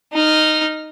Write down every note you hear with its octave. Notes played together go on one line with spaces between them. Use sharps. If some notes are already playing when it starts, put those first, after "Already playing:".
D#4 F6